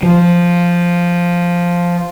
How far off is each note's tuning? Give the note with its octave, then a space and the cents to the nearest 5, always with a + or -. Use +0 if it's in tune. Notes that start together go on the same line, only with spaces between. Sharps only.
F3 +0